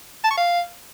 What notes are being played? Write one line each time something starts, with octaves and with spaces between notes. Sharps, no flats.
A5
C#6
F5